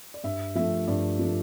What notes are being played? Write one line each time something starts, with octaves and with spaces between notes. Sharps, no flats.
D5
G2 E5
F3 A3 E5
G2 D5
F3 A3